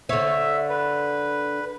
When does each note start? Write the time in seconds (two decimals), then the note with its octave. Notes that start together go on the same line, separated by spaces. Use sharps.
0.09 D3 C#5 E5
0.70 B4